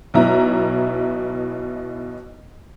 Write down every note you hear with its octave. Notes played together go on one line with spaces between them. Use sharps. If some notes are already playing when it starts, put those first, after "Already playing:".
B1 B2 E4 A#5